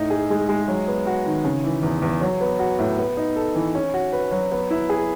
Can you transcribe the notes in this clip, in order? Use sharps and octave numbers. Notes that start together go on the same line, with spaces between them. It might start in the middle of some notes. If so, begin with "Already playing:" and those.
Already playing: A2 D#4
G#4
G#3
G#3
F#3
B3
F#4
D#3
C#3
E3
E2
E2
F#3
B3
F#4
A2
B3
D#4
A4
E3
C#4
F#4
B4
F#3
B3
E4
G#4